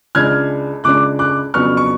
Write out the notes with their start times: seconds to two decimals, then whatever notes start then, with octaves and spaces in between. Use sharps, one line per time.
0.15 C#2 C#3 G#3 D4 F6 G#6
0.84 C#2 C#3 G#3 D4 D6 F#6
1.19 D6 F#6
1.54 F2 C#3 F#3 B3 D4 C#6 F6
1.77 C#6